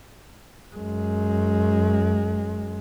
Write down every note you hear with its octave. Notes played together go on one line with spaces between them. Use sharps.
F#2 G#3